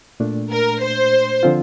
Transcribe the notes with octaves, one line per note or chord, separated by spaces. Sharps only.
A#2 A3 D4
A#4
C5
D3 F3 C4 F4